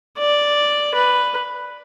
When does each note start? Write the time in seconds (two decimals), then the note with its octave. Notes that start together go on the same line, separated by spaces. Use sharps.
0.18 D5
0.95 B4